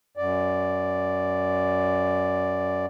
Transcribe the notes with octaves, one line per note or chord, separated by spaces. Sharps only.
F#2 D5